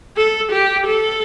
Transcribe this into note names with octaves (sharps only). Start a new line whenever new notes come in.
A4
G4
A4